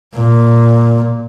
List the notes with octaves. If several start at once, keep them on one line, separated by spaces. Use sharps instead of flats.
A#2